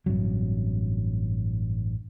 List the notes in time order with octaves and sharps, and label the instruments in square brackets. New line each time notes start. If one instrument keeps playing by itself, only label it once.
[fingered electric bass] A1 G2 C3 F#3